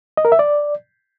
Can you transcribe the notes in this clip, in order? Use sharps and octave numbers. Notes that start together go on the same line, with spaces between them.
D#5
A#4
E5
D5